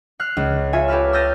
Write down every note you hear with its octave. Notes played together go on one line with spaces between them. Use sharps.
F6 F#6 C7
C#2
F4 C#5 E5 G#5
G4 A4 B4 F6
E6 F6 G6 A6 A#6 D#7